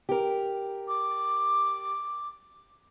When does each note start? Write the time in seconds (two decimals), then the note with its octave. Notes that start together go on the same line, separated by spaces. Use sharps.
0.09 G4 A#4
0.88 D6